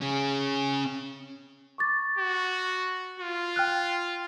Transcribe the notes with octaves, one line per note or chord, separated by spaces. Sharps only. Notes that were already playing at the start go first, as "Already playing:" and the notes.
C#4 G#4
C#6 D6 A6
F#4
F4
G5 F6 F#6